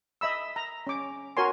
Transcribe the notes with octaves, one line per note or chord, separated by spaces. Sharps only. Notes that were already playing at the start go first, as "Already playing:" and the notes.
D#5 E5 B5 E6
A#5
C#4 D6
F#4 A#4 C#5 G#5 C6